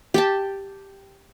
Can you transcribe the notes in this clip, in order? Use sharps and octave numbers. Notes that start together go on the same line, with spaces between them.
G4 G5 A5